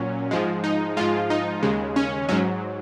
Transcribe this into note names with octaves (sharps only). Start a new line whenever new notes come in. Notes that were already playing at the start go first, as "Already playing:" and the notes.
Already playing: A#2 F#3 C#4
G#2 F3 G#3
D#4
G#2 F3 G#3 F4
D#4
D#2 C#3 G#3
C#4
G#2 F#3 C#4